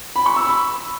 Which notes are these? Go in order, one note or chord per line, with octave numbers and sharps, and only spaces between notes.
B5
C#6
E6
B5